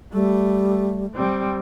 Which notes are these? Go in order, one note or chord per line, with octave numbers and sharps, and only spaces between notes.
G3 A3
G3 C4